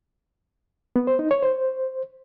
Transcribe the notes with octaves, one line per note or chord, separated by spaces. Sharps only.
B3
C5
D#4
C#5
C5